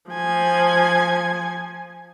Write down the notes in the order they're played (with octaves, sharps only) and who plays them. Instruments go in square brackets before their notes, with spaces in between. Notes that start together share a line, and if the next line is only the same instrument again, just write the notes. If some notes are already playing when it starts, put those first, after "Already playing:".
[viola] F3 G#5